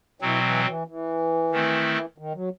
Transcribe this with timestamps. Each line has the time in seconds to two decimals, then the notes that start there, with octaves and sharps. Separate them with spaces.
0.21 B2 E3 F#3 C4
0.43 E3
0.65 E3
0.87 E3
1.52 D#3 A3 C4 E4
2.18 D#3
2.34 F#3